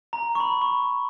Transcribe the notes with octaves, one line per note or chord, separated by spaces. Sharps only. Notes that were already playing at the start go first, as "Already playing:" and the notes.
A#5
C#6
B5
C#6